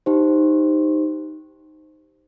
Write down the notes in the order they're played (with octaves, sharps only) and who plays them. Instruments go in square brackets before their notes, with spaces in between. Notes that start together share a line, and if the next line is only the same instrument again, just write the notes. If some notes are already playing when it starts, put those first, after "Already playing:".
[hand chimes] D#4 G4 C5